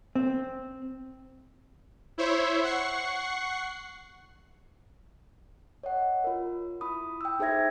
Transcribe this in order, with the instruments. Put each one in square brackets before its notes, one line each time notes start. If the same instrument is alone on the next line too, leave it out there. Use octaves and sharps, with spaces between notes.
[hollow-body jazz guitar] C4
[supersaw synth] E4 C5 C#5 E5
F#5 C#6 C7
[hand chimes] C#5 D#5 F#5
F4 A#4
E4 B5 D#6
G5 E6
D#4 G#4 C5 E5 G#6 A#6